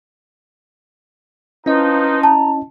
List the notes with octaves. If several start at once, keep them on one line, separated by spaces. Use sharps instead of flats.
F3 C#4 D#4 E4 B4 D#5
A5 A#5